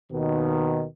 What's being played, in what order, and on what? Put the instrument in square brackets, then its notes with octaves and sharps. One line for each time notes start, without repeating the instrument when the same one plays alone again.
[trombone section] D#2 B2 D#3